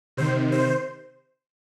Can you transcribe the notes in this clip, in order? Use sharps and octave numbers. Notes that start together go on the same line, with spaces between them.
C3 D#3 C5
C5